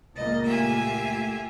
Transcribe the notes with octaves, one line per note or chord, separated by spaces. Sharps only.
C#2 A#2 A#3 D#5 A6
A3 F4 G4 E5 G#5